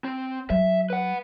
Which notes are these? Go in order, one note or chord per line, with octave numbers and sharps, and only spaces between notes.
C4
F#3 E5
B4 F#5